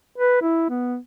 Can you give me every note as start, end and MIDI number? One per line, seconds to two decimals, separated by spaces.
0.18 0.39 71
0.42 0.67 64
0.69 0.97 59